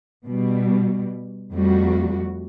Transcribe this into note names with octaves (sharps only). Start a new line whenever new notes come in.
B2 G3
F2 G3 A3 F#4